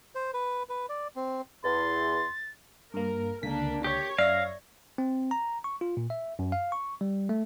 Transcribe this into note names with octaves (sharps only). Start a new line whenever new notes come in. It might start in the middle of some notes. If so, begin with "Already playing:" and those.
C5
B4
B4
D5
C4
E2 C6 A6
G2 A#3 A#4
C#2 D3 A#3 D4 B6
G4 C#5
F#2 D5 E5 F5 A#6
C4
A#5
C#6
F4
A#2
E5
F#2
F5
C#6
G3
A3